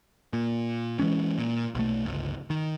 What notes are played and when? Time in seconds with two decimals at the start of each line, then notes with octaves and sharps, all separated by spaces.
0.33 A#2
0.99 E3 G#3 C#4
1.38 A#2
1.75 B1 A3
2.05 G1 C#2
2.50 D#3